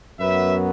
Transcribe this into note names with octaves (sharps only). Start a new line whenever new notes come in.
F#2 F#3 B3 B4 E5